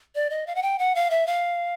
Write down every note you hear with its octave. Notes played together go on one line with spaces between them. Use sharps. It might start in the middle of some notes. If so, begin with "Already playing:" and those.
D5
D#5
F5
F#5
G5
F#5
F5
E5
F5